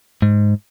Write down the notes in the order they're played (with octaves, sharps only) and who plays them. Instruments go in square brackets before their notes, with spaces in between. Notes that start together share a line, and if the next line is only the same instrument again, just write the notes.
[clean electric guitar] G#2